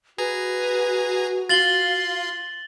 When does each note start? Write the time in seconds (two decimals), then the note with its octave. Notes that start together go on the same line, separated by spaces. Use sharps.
0.18 F#4 G#4 B4 G#5 A#5
1.49 F4 F5 C6 A6 F#7 G7